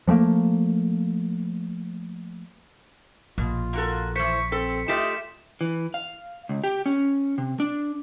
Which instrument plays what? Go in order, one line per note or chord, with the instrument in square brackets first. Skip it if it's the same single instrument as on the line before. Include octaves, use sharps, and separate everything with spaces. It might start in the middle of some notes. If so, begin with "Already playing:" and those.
[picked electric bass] F3 G3 A3 A#3
[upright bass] A#1 [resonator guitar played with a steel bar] B2 [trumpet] F4
[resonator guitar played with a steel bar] A#3 F#4 A4
[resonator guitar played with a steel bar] E3 C5 [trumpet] C#6 [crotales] B6 C#7
[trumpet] C4 [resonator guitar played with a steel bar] A4 [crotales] B6
[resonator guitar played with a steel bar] A3 F4 G4 [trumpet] D#5 [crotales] B6 E7
[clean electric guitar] E3
F5
C#2
G4
C#4
C3
D4